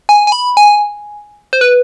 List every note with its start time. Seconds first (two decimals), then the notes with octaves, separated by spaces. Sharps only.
0.09 G#5
0.27 G#5
0.32 B5
0.57 G#5
1.53 C5
1.61 B4